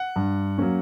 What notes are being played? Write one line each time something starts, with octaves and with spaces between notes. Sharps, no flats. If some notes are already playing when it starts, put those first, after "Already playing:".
Already playing: F#5
G2
F#3 A#3 C#4